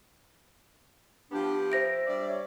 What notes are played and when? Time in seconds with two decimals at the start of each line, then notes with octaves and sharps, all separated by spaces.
1.32 F3 B3 D4 G4
1.72 C5 E5 A#6 D7
2.07 G3 D4 D5
2.29 C#5